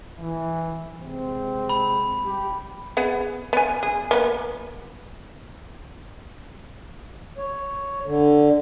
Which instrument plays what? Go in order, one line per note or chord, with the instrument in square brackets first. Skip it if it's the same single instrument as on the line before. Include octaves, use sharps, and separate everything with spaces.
[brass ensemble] E3
C3 G#3 C4
[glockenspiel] B5
[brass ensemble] G3 G4
[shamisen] B3 G#4 F#5
B3 G#5
G#4
A#3 B3
[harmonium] C#5
D3